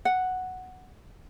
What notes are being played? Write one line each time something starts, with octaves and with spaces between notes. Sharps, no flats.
F#5